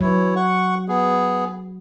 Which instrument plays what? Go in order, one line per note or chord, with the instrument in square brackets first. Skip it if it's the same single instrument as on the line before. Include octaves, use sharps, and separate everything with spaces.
[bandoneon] E3 E4 C#5 [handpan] F#3
[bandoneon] F#5 C#6
B3 G#4